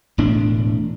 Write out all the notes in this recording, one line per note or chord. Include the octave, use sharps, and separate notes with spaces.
E1 A2 D4